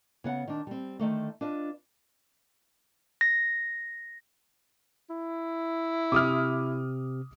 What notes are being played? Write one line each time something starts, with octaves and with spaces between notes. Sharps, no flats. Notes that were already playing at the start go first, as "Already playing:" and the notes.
C#3 B3 F#5
D#3 D4
G3 C4
D3 D#3 A3 A#3
D4 F4 B4 D#5
A#6
E4
C3 D6 D#6 F6